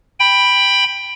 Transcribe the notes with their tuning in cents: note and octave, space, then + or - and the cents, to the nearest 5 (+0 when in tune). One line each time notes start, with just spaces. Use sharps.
G5 +10 B5 +0